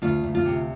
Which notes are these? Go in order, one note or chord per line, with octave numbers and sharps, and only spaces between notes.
D2 F4
D2
F4
C3